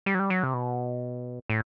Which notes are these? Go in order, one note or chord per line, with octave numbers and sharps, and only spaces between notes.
G3
F#3
G3
F#3
C3
B2
A2